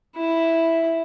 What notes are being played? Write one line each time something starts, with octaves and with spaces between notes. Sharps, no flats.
E4